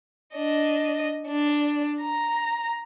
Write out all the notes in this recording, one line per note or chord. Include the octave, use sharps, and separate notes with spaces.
D4 D#5
D4
A#5